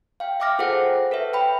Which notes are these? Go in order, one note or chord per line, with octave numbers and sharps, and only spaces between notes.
F5 G5
E5 G5 D6 F6 A#6
F4 G#4 A4 C5 F#5
A4 B4 C#5 E5
G5 B5